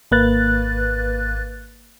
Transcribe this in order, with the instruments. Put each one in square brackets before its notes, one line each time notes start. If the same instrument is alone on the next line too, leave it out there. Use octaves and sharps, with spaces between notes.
[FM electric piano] G#1 A#3 B4 F#6 A6